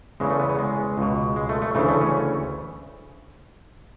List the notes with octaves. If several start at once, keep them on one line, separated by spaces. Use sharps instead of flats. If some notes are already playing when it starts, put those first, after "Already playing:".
E2 C#3 E3 G#3
A3
B3
B3
G#3
C#2 B2
G#3
A3
A3
D2 C#3 E3 A3
A3
C#4